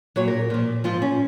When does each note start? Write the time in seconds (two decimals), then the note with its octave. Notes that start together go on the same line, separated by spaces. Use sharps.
0.16 A#2 F#3 C#5
0.28 A#4
0.50 A#2 F3
0.84 G#2 F3 F4
1.02 C#4